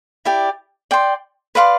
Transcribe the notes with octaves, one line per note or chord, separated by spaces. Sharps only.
E4 G4 D5
D5 G5 C6
B4 D5 F5 C6